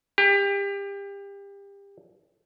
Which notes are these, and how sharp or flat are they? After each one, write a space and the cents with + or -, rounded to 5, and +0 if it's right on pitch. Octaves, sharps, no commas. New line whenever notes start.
G4 +30